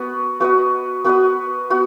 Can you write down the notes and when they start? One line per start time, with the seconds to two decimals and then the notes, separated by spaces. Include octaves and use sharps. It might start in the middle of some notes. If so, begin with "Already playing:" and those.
Already playing: B3 F#4 B4
0.40 B3 F#4 B4 D#5
1.04 B3 F#4 B4 D#5
1.70 B3 F#4